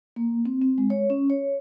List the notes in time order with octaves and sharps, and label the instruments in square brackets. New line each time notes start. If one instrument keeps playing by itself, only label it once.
[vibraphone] A#3
C4
C4
G#3
C#5
C#4
C#5